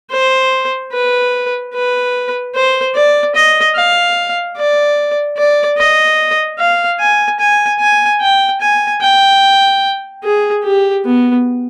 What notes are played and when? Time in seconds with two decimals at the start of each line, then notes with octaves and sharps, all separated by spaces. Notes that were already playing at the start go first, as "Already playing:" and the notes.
0.11 C5
0.92 B4
1.74 B4
2.55 C5
2.95 D5
3.35 D#5
3.76 F5
4.57 D5
5.37 D5
5.78 D#5
6.59 F5
7.00 G#5
7.40 G#5
7.80 G#5
8.21 G5
8.61 G#5
9.02 G5
10.24 G#4
10.64 G4
11.05 B3